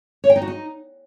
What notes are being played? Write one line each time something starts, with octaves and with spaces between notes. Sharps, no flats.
C#5
G5
D#4
F#4
D#4